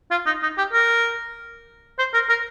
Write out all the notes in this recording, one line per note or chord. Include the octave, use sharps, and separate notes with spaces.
F4
D#4
D#4
G4
A#4
C5
A#4
A#4